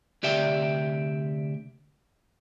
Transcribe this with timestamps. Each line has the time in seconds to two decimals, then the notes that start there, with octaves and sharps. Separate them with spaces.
0.23 D2 C3 G4 D5 E5 G5